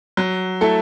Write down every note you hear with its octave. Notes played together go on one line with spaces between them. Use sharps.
F#3
A3 E4 A4